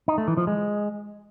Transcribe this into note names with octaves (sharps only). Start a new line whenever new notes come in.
D#4
A3
E3
F3
G#3